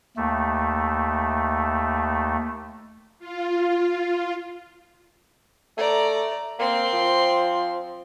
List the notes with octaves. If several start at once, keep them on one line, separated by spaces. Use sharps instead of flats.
D#2 A3
F4
A3 D5 A#5
A#3 C4 C6
F3